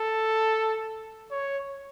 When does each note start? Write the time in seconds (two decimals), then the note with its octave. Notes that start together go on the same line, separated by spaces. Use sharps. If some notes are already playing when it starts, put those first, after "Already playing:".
Already playing: A4
1.31 C#5